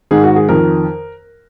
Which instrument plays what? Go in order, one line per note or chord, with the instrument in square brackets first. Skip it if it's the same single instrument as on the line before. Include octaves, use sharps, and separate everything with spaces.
[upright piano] G#2 D#3 G#4
F#4
G#4
F2 D#3 A#4